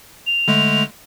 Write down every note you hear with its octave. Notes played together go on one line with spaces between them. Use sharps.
F7
D3 G#3 A3